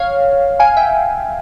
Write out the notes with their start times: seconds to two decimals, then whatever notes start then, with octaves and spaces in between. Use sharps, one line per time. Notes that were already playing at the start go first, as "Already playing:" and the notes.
Already playing: C#5 F5
0.60 F5 G#5
0.77 E5 G5